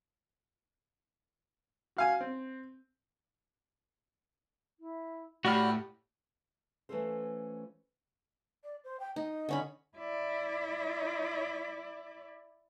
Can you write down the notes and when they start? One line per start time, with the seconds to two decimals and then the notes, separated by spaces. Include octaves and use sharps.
1.97 F#4 F5 G#5
2.21 C4
4.80 E4
5.45 A2 F#4 G4 D5 B5 F6
6.89 E3 A3 C#4 F4 A4 C5
8.64 D5
8.84 C5
9.00 G5
9.16 D#4 D#5
9.49 D3 C#4 B5
9.98 E4 D5